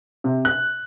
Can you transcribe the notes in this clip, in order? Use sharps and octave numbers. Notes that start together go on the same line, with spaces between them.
C3
F#6